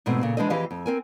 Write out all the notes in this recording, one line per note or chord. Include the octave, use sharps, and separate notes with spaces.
E2 G#2 B2 A3 C4
A#2 C#3
E3 G#3 D4 B4 C5 D#5
F2 E3 G4 G#4 D#5 F5
F2
C4 A#4 G#5